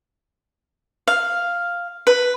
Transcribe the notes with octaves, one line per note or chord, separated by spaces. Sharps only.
F5
B4